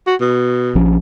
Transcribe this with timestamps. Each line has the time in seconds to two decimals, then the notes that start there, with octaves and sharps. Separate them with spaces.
0.07 F#4
0.21 B2
0.75 A#1 F3 C#4